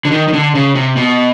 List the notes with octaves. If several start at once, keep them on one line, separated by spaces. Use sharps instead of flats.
D3
D#3
D#3
D3
C#3
C3
B2